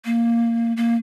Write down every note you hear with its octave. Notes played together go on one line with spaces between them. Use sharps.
A#3
A#3